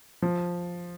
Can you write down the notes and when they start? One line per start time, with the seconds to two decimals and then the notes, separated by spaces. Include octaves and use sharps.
0.22 F3